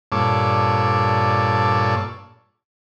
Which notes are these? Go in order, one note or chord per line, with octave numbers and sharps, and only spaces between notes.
G2 A#2 A4 C#5 D5